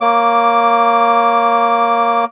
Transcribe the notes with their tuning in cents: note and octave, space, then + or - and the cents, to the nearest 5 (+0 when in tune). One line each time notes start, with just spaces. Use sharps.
A#3 +0 C#5 +0 D6 +0